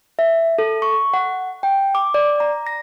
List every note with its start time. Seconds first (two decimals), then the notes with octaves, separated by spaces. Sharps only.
0.19 E5
0.59 A4
0.82 C#6
1.14 F#5
1.63 G5
1.95 D6
2.14 D5
2.40 A#5
2.67 A#6